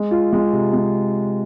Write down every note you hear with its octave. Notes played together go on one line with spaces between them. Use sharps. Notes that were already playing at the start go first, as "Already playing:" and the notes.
Already playing: G#3
F4
G#3
C3
G#3